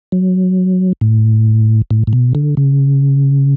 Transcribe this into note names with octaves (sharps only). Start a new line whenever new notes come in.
F#3
A2
A2
A2
B2
D3
C#3